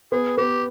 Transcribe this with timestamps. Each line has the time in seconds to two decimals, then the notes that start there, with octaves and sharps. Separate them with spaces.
0.12 B3 G#4
0.37 B3 G4